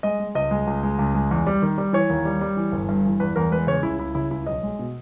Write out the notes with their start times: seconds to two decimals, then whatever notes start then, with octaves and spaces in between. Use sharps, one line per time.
0.03 G#3 D#5
0.20 G#3
0.35 C#2 D#5
0.51 G#3
0.67 C#2
0.83 G#3
0.99 C#2
1.14 G#3
1.31 E2
1.47 G3
1.62 D#3
1.78 G3
1.93 E3 C#5
2.09 D#2
2.25 G3
2.41 G3
2.57 E3
2.72 G1
2.89 G2
3.05 E3
3.20 E2 B4
3.36 E2 A#4
3.51 G#3 B4
3.67 C#3 C#5
3.83 C#2 E4
3.99 C#2 E4
4.15 C#3 E4
4.31 C#2 E4
4.46 B1 D#5
4.63 G#3
4.79 B2